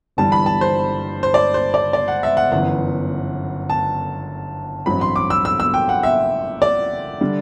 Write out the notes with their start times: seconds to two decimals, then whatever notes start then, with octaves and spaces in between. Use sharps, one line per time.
0.17 G1 G2 E3 G3 A5
0.32 B5
0.46 A5
0.61 C5
1.23 C5
1.34 D5
1.54 C5
1.74 D5
1.93 D5
2.08 F#5
2.23 E5
2.37 F#5
2.52 G1 F#2 E3 B3 F#5
3.70 A5
4.86 A1 G2 F#3 C4 B5
5.01 C6
5.16 D6
5.30 E6
5.45 E6
5.60 E6
5.74 G5
5.89 F#5
6.03 E5
6.62 D5
7.21 D3 G3